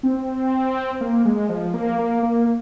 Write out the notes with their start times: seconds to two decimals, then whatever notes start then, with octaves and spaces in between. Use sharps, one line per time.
0.03 C4
1.01 A#3
1.25 G#3
1.49 F3
1.74 A#3
1.98 A#3
2.23 A#3